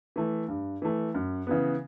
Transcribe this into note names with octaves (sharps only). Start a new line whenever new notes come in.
E3 A3
G2
E3 A3
F#2
C#3 E3 B3